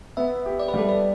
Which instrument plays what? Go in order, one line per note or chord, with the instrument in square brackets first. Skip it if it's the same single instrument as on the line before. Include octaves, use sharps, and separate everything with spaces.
[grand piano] B3 [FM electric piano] E5
[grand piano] G4
[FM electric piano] D5
B4
[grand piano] G3
[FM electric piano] A4
B4